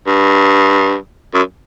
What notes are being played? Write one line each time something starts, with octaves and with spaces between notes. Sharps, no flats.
G2
F#2